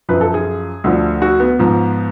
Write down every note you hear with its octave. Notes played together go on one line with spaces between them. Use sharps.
F#2 F3 B4
A4
G#4
D2 D3 F3
F#4
B3
G#2 F3